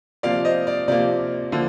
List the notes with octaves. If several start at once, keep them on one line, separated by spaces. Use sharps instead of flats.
C3 F3 A#3 D5 F5
C5 D#5
D5
C3 F3 A#3 D5
D3 F3 A#3